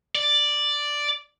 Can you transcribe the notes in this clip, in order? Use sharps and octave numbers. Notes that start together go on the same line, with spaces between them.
D5